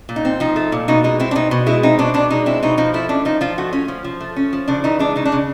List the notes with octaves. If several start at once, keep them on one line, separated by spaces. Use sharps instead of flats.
A#2
D#4
C4
F3 D#4
A3
A#2
B2 D#4
G#3 D#4
C4 E4
D4
B2 D#4
B2
G#3 E4
C4 D#4
B2 D4
B2 D4
G#3 D#4
C4 E4
B2 D#4
F3 D#4
A3 E4
C#4 D4
F3 D#4
F3 F4
A3 F#4
C#4
F3
F3
A3
C#4
F3
C#3 D4
E3 D#4
G#3 D4
C#3 D#4
D4
C#3